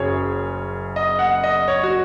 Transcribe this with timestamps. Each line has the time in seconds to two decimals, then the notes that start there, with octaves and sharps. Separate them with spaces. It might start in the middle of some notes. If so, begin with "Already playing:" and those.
Already playing: F#1 F#2 F#3 G#4 C#5
0.96 D#5
1.19 F#5
1.44 D#5
1.68 C#5
1.83 F#4